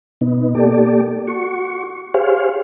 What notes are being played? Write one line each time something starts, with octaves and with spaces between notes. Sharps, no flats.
B2 B3 D#4
A#3 G4 A4 D5
F#4 C#6
G4 G#4 C5 C#5 F5